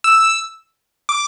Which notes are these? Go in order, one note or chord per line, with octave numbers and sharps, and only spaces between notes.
E6
D6